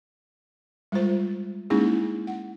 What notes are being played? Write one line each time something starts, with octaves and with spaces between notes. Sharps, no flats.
G3 G#3 F4 C5
G#3 A#3 C#4 D#4 E4 G#4
F#5